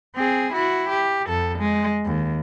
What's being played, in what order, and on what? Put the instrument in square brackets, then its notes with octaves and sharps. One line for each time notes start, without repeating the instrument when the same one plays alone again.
[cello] C4 G#4
E4 F#4
G4
F2 A4
G#3
D#2